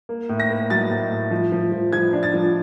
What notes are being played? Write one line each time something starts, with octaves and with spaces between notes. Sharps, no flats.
A#3
A2
A#6
A#3
F#3 A6
A2
A2
F3
F3
F3
F3 G#6
D4
A6
F3